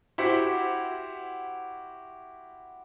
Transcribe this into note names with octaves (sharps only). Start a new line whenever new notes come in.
E4 F#4 G4 C5 F#5